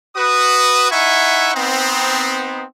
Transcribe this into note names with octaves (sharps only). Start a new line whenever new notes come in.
F#4 B4 D#6
D#4 E4 E5 F#5 G#5 C#6
B3 C4 D#4